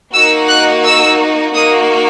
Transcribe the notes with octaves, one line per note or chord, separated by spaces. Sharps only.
A#3 D#4 F#4 E6
F#6
E6
A#3 D#4 F#4 D#6